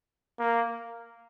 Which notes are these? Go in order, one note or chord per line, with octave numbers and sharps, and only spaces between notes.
A#3